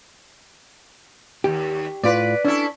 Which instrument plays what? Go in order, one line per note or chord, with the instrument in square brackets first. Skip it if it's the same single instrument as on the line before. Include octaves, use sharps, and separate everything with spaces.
[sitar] D#2 [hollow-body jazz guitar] G4
[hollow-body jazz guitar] A2 F4 [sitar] B4 D5
[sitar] C#4 E4 A4 [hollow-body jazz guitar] D4